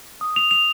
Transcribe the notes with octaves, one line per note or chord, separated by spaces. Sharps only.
D#6
F7
F7